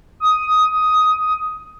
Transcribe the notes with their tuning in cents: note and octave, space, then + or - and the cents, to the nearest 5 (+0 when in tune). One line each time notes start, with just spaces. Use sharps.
D#6 +10